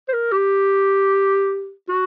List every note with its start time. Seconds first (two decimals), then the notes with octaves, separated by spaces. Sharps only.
0.08 C5
0.13 A#4
0.32 G4
1.89 F#4